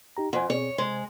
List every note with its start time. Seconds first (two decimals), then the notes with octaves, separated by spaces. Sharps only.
0.17 D#4 G4 A#5
0.33 F2 F#5 G#5
0.50 B2 C4 G#4 C#5
0.78 C3 G#3 C5